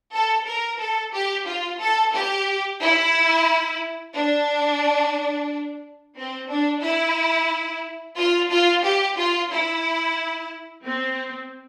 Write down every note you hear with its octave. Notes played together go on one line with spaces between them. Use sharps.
A4
A#4
A4
G4
F4
A4
G4
E4
D4
C4
D4
E4
F4
F4
G4
F4
E4
C4